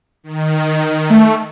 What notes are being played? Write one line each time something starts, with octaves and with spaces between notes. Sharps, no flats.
D#3
A3